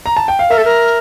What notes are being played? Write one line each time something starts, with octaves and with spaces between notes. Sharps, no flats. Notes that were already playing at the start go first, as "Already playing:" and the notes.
A#5
A5
G5
F5
A#4 E5
A4
A#4